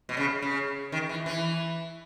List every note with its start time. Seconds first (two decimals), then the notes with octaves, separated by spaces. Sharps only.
0.09 B2
0.17 C#3
0.42 C#3
0.92 D#3
1.09 E3
1.26 E3